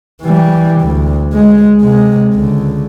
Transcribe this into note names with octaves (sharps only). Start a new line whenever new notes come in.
E3 G3
D2
G#3
C3 G#3
C#2 D3